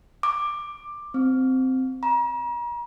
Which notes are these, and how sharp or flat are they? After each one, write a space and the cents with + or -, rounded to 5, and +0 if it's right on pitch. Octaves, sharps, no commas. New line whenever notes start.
D6 +15
C4 -10
A#5 +40